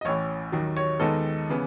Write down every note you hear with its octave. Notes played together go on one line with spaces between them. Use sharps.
D#5
A1 A2 E3 C#5
D#2 D#3 F#3
C#5
D#2 D#3 G#3 B3 D#4 A4
C#3 E3 B3